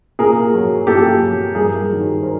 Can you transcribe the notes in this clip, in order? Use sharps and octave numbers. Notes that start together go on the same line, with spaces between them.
A#2 G#4 A#4
F#3
A#2 G4 A4
F#3
G2 G#4 A#4
D#3 F#3
A#4 C5